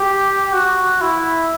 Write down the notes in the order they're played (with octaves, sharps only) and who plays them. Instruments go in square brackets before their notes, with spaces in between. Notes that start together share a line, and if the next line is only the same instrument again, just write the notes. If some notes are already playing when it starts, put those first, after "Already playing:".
Already playing: [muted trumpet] G4
F#4
E4